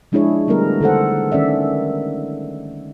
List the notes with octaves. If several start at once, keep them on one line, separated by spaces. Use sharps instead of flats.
F3 G#3 D4 E4 G#4 C#5
D3 G3 A3 B3 A#4
D3 D#3 A4 C5 F#5
D#3 C#4 D5 E5